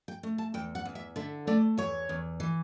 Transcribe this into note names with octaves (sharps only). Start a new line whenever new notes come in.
G5
A3
A5
E2 G5
F#5
E2
E5
D3 E5
A3 D5
E2 C#5
E2
E3